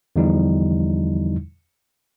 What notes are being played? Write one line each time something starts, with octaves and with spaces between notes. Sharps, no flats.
E2 D3 F3 G3 D#4 E4